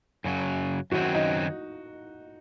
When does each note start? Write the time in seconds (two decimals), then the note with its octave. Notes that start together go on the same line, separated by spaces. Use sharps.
0.24 F#2 C#3 F#3
0.91 F#2 D#3 F#3 C4 F#4
1.15 D#4